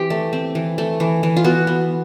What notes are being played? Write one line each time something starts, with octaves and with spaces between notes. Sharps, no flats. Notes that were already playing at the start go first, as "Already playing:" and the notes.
Already playing: E3 C4 G4
A3
C4
E3
A3
E3
E3
F4
B3 F#4
B3